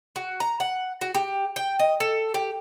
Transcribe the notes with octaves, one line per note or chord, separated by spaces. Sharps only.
F#4
A#5
F#5
F#4
G4
G5
D#5
A4
G4